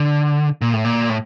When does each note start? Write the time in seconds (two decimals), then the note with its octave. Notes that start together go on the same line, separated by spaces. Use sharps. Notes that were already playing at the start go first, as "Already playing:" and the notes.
Already playing: D3
0.62 A#2
0.73 A2
0.84 A#2
1.09 A2